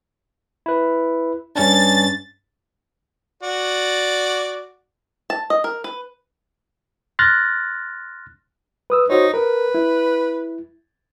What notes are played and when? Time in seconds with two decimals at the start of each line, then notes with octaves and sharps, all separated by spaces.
0.66 E4 B4
1.56 G2 C#4 D4 A6
3.43 F#4 D5
5.30 A5
5.50 D#5
5.64 A#4
5.84 B4
7.19 C6 F6 F#6 A6 A#6
8.90 B4 D#6 E6
9.10 D#4 F#4 C5 C#5
9.34 A#4 B4
9.75 E4